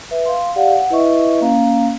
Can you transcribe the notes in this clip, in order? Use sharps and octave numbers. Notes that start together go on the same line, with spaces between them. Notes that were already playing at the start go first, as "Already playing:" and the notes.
B4 E5
F5 C6
G4 D5 F5 F#5
F#5
E4 B4 D#5 E5 C#6
A#3 C#4 F5 A#5